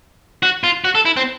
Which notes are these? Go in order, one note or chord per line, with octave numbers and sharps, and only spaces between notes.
F#4
F4
F#4
A4
E4
C4